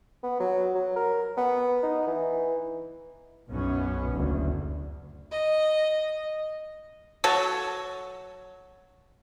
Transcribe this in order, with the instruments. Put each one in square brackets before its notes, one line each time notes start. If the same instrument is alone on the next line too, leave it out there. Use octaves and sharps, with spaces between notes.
[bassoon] B3
F#3
F#3
A#4
B3
D#4
E3
[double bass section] B1 F#2 B3 C#4
F#1 D2
[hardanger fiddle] D#5
[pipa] F#3 F#4 A4 C#5